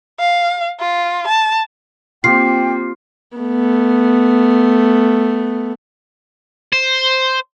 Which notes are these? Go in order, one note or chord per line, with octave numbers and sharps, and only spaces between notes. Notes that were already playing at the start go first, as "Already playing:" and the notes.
F5
F4
A5
A#3 C4 F4 G4 G5 C7
A3 B3
C5